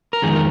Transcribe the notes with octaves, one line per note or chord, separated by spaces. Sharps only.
A#4
F2 D#3 G#3 G#4
A#4